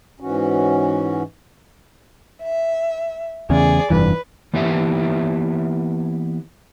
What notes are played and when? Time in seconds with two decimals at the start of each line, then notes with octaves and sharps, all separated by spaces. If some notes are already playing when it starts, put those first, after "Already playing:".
0.20 G#2 E3 C#4 F#4
2.44 E5
3.50 E2 C#3 G#4 D5
3.90 F1 G2 E3 B4
4.53 E3 A#3 B3 E4 G4 E5